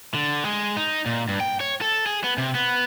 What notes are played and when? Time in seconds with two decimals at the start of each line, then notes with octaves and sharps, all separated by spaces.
0.14 D3
0.45 G#3
0.77 D#4
1.06 A#2
1.28 G2
1.40 G5
1.60 C#5
1.81 A4
2.06 G#4
2.24 B3
2.38 C3
2.55 B3